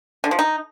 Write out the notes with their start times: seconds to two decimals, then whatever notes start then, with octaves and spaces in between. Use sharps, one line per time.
0.24 D3
0.31 F3
0.39 D#4